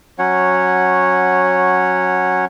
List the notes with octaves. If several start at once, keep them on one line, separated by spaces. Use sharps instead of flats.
F#3 C#4 C#5 F#5